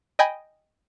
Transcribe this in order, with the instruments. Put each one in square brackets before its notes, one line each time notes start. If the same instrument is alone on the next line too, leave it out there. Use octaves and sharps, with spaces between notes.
[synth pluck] D#5 G5 G#5 B5